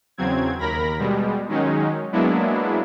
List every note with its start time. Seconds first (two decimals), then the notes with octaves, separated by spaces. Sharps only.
0.18 E2 C#3 F#3 C4 G#6
0.59 D#2 A#4 B5 A#6
0.99 B2 G3 G#3
1.48 D#3 F#3 G#3 C#4 D#4
2.12 F#3 G#3 A#3 B3 D4 E4